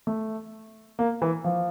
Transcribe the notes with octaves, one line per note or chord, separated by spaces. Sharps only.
A3
A#3
E3
F3